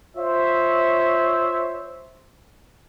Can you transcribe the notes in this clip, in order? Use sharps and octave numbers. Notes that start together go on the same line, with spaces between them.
F4 C5 C#5 E5